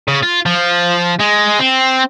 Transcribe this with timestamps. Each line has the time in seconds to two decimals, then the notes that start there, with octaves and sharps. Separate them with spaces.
0.08 C#3
0.23 F4
0.46 F3
1.20 G#3
1.59 C4